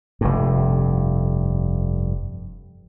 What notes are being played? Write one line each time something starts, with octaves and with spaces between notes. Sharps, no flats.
F1 G2